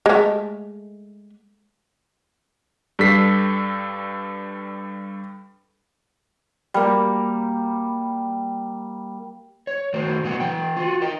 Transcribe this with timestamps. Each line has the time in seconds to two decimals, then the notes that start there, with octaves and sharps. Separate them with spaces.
0.06 G#3 A3
2.99 G2 G3 A4 B6 C7
6.74 G3 A#3
9.67 C#5
9.93 D#3 A3 F#4 A#4 C5
10.24 A#2 F#3 G3 B3 G4 F#5
10.40 E3 G5
10.77 F4 F#4
11.02 A#4 D#5 G5